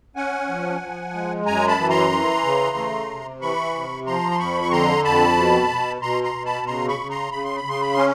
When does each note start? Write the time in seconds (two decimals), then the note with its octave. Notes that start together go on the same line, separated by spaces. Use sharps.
0.16 C#4 F#5 G#5
0.48 F3
0.81 F3
1.13 G#3
1.46 F#2 G#5 A#5
1.68 A5 B5
1.79 E3
1.90 A#5 C6
2.11 E3
2.45 C#3
2.77 A3
3.09 C3
3.41 E3 B5 C#6
3.74 C3
4.06 F3 A#5 C6
4.32 C6
4.39 F2 B5 C#6
4.62 C#6
4.72 D3 A#5 C6
5.04 F2 A5 B5
5.37 B2
5.69 B2
6.02 B2 A#5 C6
6.23 A#5 C6
6.34 B2
6.45 A5 B5
6.66 C#3 A#5 C6
6.88 B5 C#6
6.99 C#3
7.10 A#5 C6
7.32 C#3 B5
7.44 C6
7.57 B5
7.64 C#3 C6
7.81 B5
7.93 C#4 C6